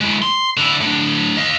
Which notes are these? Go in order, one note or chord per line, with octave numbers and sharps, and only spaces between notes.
G#3 E4
C6
D3 E4
A2 D4
D#5 F5